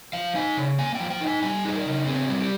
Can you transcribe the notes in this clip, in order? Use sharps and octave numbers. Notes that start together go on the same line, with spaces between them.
F3 F5
D#4 G#5
C#3
A#3 G#5
G5
F3
G5
D#4
G#5
G3 G#5
D#4 G#4
A#4
C#3
C4 G#4
G3
G4